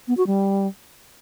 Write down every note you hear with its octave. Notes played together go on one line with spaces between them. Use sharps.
B3
F#4
G3